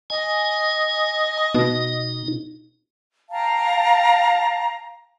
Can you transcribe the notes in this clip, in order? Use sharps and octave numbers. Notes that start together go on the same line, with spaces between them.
D#5 G#5
B2 D#4
F5 G5 A5 A#5